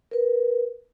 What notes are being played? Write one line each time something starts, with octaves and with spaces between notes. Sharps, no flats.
A#4 B4